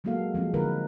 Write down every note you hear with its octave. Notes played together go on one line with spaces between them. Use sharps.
F#3 G#3 A#3 F#4 A4 F5
F3 G#3 C4
D3 D#3 D#4 F4 A#4 B4